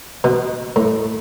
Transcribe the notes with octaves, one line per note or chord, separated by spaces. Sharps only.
B2
A2